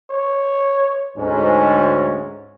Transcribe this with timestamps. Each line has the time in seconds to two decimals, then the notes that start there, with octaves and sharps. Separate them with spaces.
0.11 C#5
1.18 D2 G#2 C#4